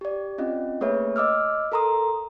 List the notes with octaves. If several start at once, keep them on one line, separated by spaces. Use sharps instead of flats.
G4 D5
C4 C#4 F4 D#5
A3 A#3 G#4 B4 C#5 E5
D#5 D6 E6 F6
A4 A#4 A#5 C6 D#6